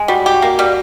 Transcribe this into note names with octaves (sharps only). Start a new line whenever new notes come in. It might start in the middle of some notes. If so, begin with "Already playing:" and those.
Already playing: G#3
G3 F#4
G4
F#4
A#3
G3 F#4